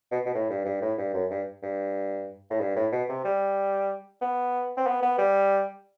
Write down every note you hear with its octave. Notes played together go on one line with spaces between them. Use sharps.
B2
B2
A2
G2
G2
A2
G2
F#2
G2
G2
A2
G2
A2
B2
C3
G3
B3
C4
B3
B3
G3